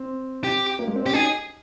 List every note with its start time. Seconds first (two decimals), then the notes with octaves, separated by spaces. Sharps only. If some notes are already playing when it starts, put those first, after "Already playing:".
Already playing: C4
0.44 G4
0.79 A#3
0.87 G#3
0.96 C4
1.05 C#4 G4
1.13 D#4 G#4